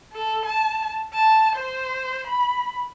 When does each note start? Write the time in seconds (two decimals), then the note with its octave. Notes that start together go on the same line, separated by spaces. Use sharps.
0.12 A4
0.45 A5
1.14 A5
1.55 C5
2.27 B5